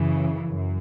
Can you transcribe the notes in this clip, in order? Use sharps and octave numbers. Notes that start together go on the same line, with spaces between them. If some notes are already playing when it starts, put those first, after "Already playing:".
Already playing: F#2 C#3 E3
F#2